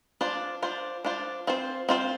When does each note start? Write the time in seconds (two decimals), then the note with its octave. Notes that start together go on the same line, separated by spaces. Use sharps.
0.21 D4 F4 C5
0.62 D4 F4 C5
1.05 D4 F4 C5
1.47 C4 F4 C5
1.89 C4 F4 C5